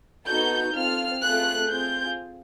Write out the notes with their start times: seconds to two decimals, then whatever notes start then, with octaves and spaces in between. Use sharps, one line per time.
0.27 B3 D#4 F#4 A4 G6
0.74 C4 F4 A4 F6
1.22 A3 C4 F4 G#4 F#6
1.69 C4 F4 G#4 G6